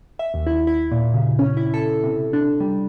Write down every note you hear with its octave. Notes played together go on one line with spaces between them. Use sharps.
E5
D#2
E4
E4
A#2
C#3
C#4
E4
A4
C3
D4
G3